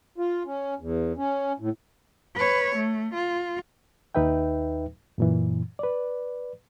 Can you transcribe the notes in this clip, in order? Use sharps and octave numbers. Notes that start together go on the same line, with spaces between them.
F4
C#4
E2
C#4
A2
B4 C#5
A3
F4
D#2 D#4 B4 E5 G5
F#2 A#2 E3
B4 D5